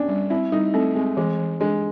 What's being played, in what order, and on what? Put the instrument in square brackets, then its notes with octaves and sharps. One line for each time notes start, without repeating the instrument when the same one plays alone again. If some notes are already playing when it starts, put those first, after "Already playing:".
Already playing: [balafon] B3 [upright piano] C#4 D4
[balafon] G3
[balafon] C4 [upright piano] E4
[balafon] G3 [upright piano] D#4
[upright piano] A3 [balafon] C4
[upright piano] G#3 [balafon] C4
[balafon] E3 [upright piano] G#3
[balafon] E3
[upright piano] G#3 [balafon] D4